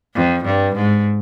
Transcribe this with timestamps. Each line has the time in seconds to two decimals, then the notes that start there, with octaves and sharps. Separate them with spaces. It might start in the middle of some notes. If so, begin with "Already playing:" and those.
0.15 F2
0.45 G2
0.76 G#2